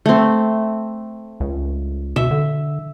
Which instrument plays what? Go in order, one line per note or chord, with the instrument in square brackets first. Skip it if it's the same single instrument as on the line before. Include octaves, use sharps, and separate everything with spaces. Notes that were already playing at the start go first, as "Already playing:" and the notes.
[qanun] A3 C4
[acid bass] C#2
[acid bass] B2 [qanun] E5
[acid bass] D3